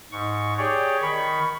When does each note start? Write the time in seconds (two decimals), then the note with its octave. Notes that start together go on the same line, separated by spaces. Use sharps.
0.12 G#2 C#6
0.58 G4 G#4 C#5 D5
1.02 D#3 B5 C#6